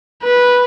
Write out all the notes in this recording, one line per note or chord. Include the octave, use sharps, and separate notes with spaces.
B4